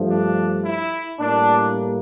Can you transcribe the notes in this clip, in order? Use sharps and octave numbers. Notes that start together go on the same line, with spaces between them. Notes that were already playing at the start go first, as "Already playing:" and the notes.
Already playing: G2 F3 A3
D4
E4
A2 G3 A#3 D4